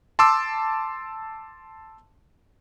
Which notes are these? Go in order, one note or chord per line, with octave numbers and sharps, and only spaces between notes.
A5 C6 D6 E6